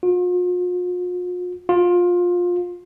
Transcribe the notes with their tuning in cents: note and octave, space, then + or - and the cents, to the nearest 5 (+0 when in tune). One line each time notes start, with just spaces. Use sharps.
F4 +45
F4 +20